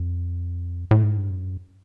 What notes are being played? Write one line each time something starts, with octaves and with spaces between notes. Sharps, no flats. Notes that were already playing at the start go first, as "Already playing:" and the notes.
Already playing: F2
A2
G#2
G2
F#2